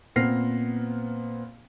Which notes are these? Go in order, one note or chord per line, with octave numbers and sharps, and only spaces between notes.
A#2 B3 C4 F6 A#6 C7